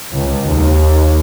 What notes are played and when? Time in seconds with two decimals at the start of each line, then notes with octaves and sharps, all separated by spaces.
0.11 C#2
0.46 D#2